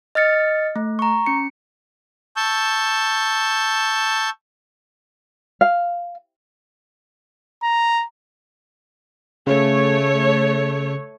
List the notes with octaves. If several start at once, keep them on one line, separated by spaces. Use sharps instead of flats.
D#5 F6 A6 C#7
A3
A#5 C#6
C#4 C#7
A5 C#6 E6 G6
F5
A#5
C#3 A3 C#5